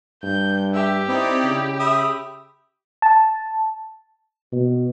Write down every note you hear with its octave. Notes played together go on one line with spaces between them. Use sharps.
G2 G6
G4 E5
C4 D#4 E4 D5
C#3
E5 B5 D#6
A5
B2